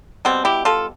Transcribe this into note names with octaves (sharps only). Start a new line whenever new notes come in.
B2 G3 C4
E4 G4
F4 A4